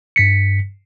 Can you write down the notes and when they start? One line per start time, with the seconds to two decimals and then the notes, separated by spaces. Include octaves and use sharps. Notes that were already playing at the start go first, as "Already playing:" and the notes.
0.16 G2 B6 C#7